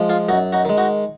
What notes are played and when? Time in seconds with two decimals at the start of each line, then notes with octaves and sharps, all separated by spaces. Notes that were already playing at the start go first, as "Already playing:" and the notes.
Already playing: F3 G#3
0.09 F4 G#4
0.29 F#2 D#4 F#4
0.52 D#4 F#4
0.65 D#3 G#3
0.78 D#4 F#4